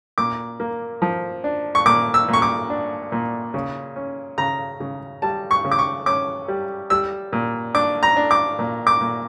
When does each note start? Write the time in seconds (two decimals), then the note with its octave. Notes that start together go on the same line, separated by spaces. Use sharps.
0.18 A#2 D6
0.60 A#3
1.02 F3
1.44 D4
1.75 C#6
1.86 A#2 D6
2.14 E6
2.28 A#2
2.33 C#6
2.42 D6
2.70 D4
3.12 A#2
3.54 C#3
3.96 C#4
4.38 C#3 A#5
4.80 C#3
5.22 G3 A5
5.51 C#6
5.65 C#3
5.72 D6
5.79 C#6
6.06 C#4 D6
6.48 G3
6.90 G3 E6
7.33 A#2
7.74 D4 D6
8.03 A#5
8.16 D4
8.31 D6
8.59 A#2
8.87 D6
9.01 A#2